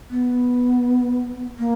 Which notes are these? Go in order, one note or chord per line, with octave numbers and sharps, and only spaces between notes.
B3
A#3